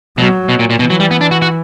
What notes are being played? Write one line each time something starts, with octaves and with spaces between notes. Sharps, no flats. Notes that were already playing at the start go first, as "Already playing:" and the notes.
B2 F#3
B2
A#2
A#2
B2 E3
F#3
G3
B3
D4
F#4
F#4